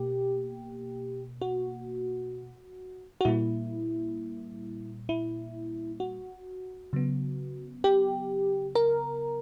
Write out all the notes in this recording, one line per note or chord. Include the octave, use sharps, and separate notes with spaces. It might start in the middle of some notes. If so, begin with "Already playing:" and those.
Already playing: B2 A#3 G4
F#4
F#4
A#2 G3 A#3 E4
E4
F#4
C#3 F#3 B3
G4
A#4